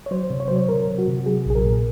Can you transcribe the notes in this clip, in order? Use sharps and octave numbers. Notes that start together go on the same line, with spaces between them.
C#5
F#3 C5
C3
C#5
C5
F#3
C#5
C3 A#4
C3
F#4
C3
F#3 G#4
A#1 G#4
A#4
A#2